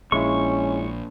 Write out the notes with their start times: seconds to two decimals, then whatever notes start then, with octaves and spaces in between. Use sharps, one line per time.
0.12 A#1 G#3 C#4 E4 F4 C#6